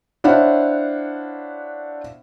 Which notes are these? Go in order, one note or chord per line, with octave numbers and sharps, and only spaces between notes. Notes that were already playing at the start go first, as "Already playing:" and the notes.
D4 E4 C5 C#5 F5 F#5